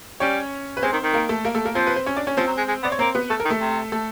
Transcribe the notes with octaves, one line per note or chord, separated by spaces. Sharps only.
G3 C#4 C#5
B4
G#3 C4 C5
D#3
D#3
A#3 A#4
A3 A4
A#3 A#4
A3 A4
A#3 A#4
F3 C4 C5
B4
C5
C#4 C#5
D4 D5
C#4 C#5
F3 C4 C5
F#3
G#3
G#3
B3 D5
C#5
A#3 C4 C5
B3 B4
A3 A4
A#4
D#3
A3 A4
C3
A3 A4